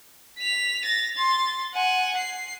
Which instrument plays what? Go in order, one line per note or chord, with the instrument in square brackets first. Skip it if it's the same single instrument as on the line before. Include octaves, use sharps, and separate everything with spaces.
[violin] B6 F7
A6 A#6
C6 A6
F#5 G#5
C7